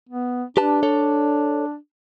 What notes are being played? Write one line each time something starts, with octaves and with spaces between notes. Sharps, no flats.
B3
D4 G4 B4 A5
A4 C#5 D5